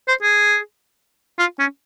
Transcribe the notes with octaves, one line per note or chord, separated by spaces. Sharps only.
C5
G#4
F4
C#4